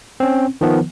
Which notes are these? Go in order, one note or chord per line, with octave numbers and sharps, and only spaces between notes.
C4 C#4
D#3 F3 B3